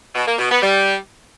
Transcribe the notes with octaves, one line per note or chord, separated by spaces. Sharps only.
B2
A#3
B2
B3
G3